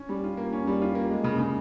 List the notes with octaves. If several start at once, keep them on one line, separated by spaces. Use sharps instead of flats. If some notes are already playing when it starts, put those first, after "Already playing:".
Already playing: C#4
G3
F4
A#3
C#4
G3
F4
A#3
G#3
C#3
C#3